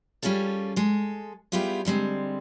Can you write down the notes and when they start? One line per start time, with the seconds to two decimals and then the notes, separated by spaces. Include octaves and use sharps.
0.22 G3 C#4 F4 G#4 A4
0.76 G#3 A4
1.52 G3 B3 E4 F4 G4 G#4
1.85 D3 G3 G#3 C4